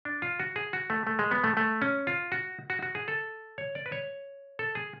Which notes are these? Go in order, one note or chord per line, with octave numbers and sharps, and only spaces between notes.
D4
F4
F#4
G#4
F#4
A3
A3
G#3
B3
A3
A3
C#4
F4
F#4
F#4
F#4
G#4
A4
C#5
D5
B4
C#5
A4
G#4